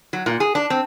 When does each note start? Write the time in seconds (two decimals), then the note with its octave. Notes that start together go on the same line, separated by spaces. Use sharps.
0.13 F#3
0.26 A#2
0.40 G#4
0.55 D4
0.70 C4